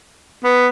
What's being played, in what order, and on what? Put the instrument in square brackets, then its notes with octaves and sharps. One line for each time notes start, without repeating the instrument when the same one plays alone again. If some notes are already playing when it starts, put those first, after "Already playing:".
[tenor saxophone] B3